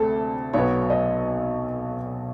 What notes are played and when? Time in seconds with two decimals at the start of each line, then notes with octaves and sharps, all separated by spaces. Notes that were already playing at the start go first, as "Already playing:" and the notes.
Already playing: D2 C3 A4
0.53 B1 B2 F#3 B3 C#5
0.90 D#5